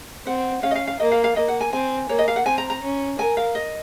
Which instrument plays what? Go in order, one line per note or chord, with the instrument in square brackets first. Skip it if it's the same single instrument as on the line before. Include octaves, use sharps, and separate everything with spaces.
[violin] C4 [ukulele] F#5
[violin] C#4 [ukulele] F5
[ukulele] D#5
F5
F5
[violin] A#3 [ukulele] D#5
[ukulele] F5
F5
[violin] A#3 [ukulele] D#5
[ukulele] F#5
G#5
[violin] C4 [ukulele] G#5
[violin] A#3 [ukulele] C#5
[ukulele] D#5
F5
F#5
[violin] C4 [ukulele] G#5
[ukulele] A#5
A#5
[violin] C#4
[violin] A#4 [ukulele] G#5
[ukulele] F5
D#5